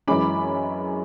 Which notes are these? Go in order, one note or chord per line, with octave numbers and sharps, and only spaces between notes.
F#2 E3 G#3 C#4 B5 D6